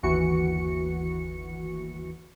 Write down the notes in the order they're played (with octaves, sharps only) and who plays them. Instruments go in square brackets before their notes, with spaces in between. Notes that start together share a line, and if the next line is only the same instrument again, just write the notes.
[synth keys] G1 D#2 E3 F#4 C#7